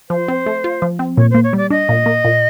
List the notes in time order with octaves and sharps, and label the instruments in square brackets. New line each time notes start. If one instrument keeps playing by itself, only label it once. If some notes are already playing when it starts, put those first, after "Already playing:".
[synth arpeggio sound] F3 [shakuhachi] C5
[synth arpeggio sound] C4
A3
F4
F3
C4
[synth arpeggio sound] A#2 [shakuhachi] C#5
[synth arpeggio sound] A#3 [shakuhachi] C5
[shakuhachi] C#5
[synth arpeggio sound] G3 [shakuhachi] D5
[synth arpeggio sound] D4 [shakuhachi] D#5
[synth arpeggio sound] A#2
A#3
A#2